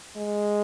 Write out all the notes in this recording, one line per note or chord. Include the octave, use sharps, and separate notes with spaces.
G#3